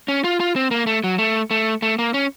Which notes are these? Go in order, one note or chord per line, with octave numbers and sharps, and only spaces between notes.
C#4
F4
F4
C4
A#3
A3
F#3
A3
A3
A3
A#3
C#4